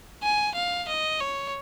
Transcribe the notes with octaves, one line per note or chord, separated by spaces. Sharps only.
G#5
F5
D#5
C#5